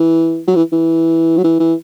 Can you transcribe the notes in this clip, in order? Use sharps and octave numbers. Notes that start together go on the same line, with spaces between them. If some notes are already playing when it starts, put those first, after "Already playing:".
Already playing: E3
F#3
E3
E3
F#3
E3
E3